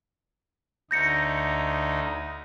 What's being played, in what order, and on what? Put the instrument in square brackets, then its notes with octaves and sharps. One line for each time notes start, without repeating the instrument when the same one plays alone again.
[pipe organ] D2 D#4 [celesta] G6 A#6 C#7